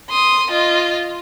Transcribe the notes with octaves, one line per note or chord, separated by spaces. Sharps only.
C6 D#6
F4 D#5